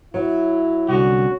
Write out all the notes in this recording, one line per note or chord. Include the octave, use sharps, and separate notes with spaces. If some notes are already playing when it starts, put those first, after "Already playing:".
F#3 E4
C2 D3 C#4 F#4